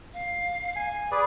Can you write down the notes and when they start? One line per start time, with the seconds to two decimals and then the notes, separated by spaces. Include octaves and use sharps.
0.13 F5
0.76 G#5
1.12 G#4 B4 D5